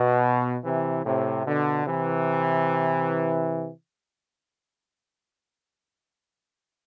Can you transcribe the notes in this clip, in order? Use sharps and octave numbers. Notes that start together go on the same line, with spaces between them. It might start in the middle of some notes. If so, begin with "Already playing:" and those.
Already playing: B2
C3 E3
A2 C3
B2 D3
C3 E3